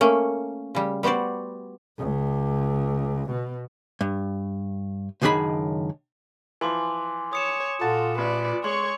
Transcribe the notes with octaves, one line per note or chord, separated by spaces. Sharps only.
A3 A#3 C#4
C#3 G3
G3 B3 F#4 C5 D5
C#2
B2
G2
C#2 F#2 D#3 D4 G#4 B5
E3 F3 G#5 C6 D6
C#5 D#6 C#7 E7
A#2 F4 F#4 A4 A5
A1 B4 D5
G#3 C#5 C6 C#6